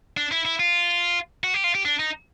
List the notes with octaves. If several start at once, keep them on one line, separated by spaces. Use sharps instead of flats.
D4
E4
E4
F4
F#4
G4
F4
G4
D4
D#4